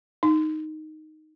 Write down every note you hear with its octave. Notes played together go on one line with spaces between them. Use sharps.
D#4